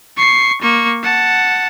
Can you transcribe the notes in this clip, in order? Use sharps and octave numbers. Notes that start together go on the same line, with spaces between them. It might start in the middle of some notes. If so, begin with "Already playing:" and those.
C#6 C7
A#3 C#6
F#5 A5